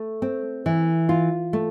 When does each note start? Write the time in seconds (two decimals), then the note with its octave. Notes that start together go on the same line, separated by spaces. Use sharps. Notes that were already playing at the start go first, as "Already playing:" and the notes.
Already playing: A3
0.22 C4
0.66 E3
1.09 F4
1.53 A3